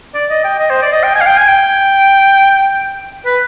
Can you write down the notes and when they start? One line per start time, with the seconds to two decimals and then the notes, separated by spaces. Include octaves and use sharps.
0.14 D5
0.30 D#5
0.44 G5
0.60 D#5
0.70 C5
0.82 D5
0.92 D#5
1.03 G5
1.15 G#5
1.21 F5
1.26 G5
1.37 G#5
1.48 G5
3.26 B4